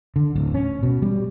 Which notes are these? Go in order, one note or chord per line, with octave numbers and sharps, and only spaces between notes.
D3
D1
C#4
B2
G3